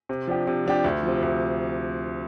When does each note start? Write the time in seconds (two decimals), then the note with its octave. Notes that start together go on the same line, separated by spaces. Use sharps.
0.09 C3
0.27 F3 D4 G4
0.47 C3
0.66 F3 D4 G4
0.84 D2
1.03 C3 F3
1.22 D2